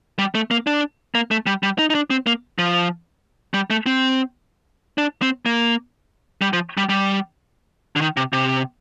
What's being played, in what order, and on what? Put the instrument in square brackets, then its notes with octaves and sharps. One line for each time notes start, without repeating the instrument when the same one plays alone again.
[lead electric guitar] G3
A3
A#3
D4
A#3
A3
G3
G3
D#4
D#4
D4
C4
A#3
F3
G3
A3
C4
D4
C4
A#3
G3
F3
G3
G3
D3
D#3
C3
C3